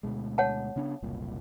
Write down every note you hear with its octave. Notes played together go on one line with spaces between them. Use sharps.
D2 B2 G#3
C#5 F#5 A5
C#3 B3 D4
F#1 C2 A#2